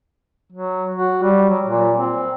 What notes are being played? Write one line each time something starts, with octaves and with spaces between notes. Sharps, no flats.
F#3
F#4
G3
F#3
A#2
C4